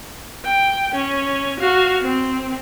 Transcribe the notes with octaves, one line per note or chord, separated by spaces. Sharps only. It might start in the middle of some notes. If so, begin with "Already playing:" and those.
G5
C#4
F#4 F5
C4